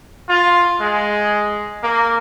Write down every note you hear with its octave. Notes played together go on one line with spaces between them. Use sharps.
F4
G#3
A#3